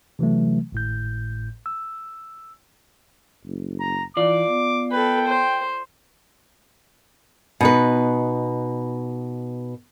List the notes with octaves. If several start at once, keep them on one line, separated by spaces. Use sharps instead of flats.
C3 E3 F#3 A3
G#1 A2 G6
E6
F#1
A#5
E3 F4 D5 D6
B3
A4 B4 G5
C5
B2 D#4 B4